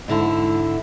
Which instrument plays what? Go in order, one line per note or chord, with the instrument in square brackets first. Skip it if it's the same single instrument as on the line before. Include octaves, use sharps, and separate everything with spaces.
[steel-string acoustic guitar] G#2 D3 E4